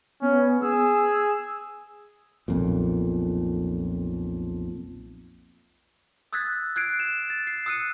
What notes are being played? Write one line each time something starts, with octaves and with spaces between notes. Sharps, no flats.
B3 C#4
G#4 E6
B1 F2 A#2
D#6 E6 F#6 G#6 A6 B6
F#6 G#6 C7 D7
E7
A6
C7
D#6 E6 F#6 C#7 D#7